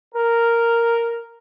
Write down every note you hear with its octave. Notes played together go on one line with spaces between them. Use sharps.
A#4